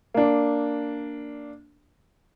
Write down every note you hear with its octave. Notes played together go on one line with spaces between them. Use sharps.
A#3 D4